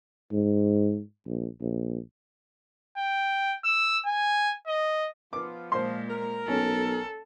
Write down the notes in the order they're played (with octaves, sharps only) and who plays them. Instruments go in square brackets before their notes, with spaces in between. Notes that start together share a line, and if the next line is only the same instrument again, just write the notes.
[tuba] G#2
A#1
A#1
[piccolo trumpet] G5
E6
G#5
D#5
[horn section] F3 B3 F4 [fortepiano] D6
[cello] A#2 G#3 [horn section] F3 [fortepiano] C5 C6
[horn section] A#4
[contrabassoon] B1 [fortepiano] C#4 [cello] A4